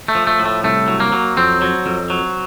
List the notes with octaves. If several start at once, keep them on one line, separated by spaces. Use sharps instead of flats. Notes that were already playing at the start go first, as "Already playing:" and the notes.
A3
F3
A3
A2
A3
C2 A3
F#3
A#3
F#3
F2 C4
F#3
F2
F#3